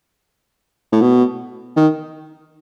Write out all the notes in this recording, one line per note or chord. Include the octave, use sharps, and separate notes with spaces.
A2
B2
D#3